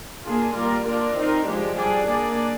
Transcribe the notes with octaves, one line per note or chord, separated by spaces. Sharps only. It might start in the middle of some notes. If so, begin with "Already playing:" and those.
A#3 D4 F4 G#4
G3 A#3 F4 A#4 D5
A#3 D4 F4 A#4 D5
C4 D#4 A#4
F3 G#3 D4 G4
G3 D4 G#4 D5
A#3 D4 G#4 D5